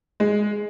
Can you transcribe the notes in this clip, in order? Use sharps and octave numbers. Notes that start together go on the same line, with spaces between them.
G#3